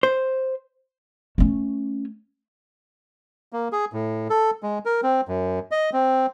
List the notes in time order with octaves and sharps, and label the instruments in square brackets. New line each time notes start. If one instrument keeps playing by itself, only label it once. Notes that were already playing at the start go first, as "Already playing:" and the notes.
[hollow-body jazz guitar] C5
[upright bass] A3 C#4
[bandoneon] A#3
G#4
A2
A4
G#3
A#4
C4
F#2
D#5
C4